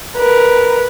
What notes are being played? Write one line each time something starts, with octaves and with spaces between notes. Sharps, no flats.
A#4 B4